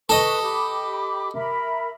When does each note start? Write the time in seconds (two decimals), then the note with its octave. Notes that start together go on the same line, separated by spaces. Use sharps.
0.09 A4 B4 D#5 C#6
0.42 G4 B5 D6
1.34 A#4 E5 B5